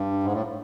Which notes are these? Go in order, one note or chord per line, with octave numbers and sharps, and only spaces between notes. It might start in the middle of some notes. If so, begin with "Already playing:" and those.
Already playing: G2
G#2
A2